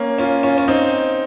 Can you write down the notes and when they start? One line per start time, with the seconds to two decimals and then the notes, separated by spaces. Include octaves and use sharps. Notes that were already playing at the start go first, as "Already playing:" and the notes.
Already playing: A#3 C#4
0.18 C#4 F4
0.43 C#4 F4
0.58 C#4
0.68 C4 D#4